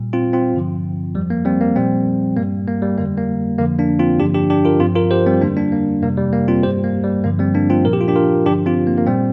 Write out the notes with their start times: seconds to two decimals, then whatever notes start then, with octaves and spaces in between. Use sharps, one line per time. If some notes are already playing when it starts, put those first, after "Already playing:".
Already playing: A#2 G3
0.13 C4 F4
0.33 C4 F4
0.54 G2 D3 F3
1.15 F2 F3 G3
1.30 A#3
1.45 G3 C4
1.61 A#3
1.76 A#2 F3 G3 C4
2.37 G2 G3 A#3
2.67 A#3
2.82 G3
2.97 F2 D3 G3 A#3
3.17 A#3
3.58 F2 D3 F3 A#3
3.79 A#3 D4
3.99 C4 F4
4.20 G2 D3 F3 D4 G4
4.35 D4 G4
4.50 D4 G4
4.65 F4 A#4
4.80 G2 F3 C4 F4
4.96 F4 A#4
5.11 G4 C5
5.27 G3 C4
5.41 F2 D3 G3 A#3 D4
5.57 A#3 D4
5.72 A#3
6.02 F2 C3 G3 A#3
6.18 G3
6.33 A#3
6.48 C4 F4
6.63 G3 G4 C5
6.67 G2
6.84 A#3
7.04 G3
7.24 G2 D3 F3 A#3
7.39 G3 C4
7.54 A#3 D4
7.70 C4 F4
7.85 A#2 F3 A#4
7.93 G4
8.01 F4
8.08 D4 G4
8.16 F4 A#4
8.46 G2 D3 F3 D4 G4
8.66 C4 F4
8.87 A#3
8.98 A#3
9.07 A#2 G3 C4